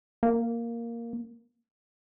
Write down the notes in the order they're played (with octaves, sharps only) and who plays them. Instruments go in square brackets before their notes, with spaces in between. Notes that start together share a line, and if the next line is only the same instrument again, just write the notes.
[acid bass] A#3